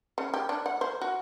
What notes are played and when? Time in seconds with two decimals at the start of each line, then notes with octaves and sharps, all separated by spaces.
0.18 C#3
0.34 G4
0.49 D4
0.66 F#5
0.81 C5
1.01 F#4